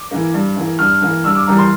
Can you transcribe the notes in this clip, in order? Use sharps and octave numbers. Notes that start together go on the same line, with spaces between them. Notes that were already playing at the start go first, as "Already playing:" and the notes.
Already playing: D6
E3 A#3
G2
E3 A#3
G2 F6
E3 A#3
G2 E6
D6
E3 G3 A#3 A#5
C6